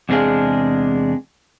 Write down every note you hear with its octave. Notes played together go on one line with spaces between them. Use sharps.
E2 C3 G#3 D4 G#4 F5